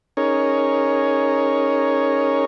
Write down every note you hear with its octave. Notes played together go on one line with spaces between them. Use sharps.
C#4 D#4 G#4 A#4 C#5